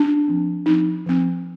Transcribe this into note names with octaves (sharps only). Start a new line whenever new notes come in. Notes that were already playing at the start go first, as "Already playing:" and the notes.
Already playing: D4
F3 C4
F3 C4 D#4
F3 C4